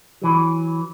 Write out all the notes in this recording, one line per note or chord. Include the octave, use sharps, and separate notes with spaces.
E3 F#3